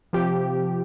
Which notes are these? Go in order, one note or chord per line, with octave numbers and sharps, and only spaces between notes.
C3 F3 G4